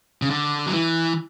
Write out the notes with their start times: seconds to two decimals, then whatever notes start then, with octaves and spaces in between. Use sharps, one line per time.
0.22 C#3
0.30 D3
0.67 F#3
0.74 E3